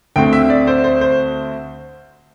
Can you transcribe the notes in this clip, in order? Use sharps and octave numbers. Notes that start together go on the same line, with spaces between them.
D2 D3 A3 C4 G5
E5
D5
C5
C5
C5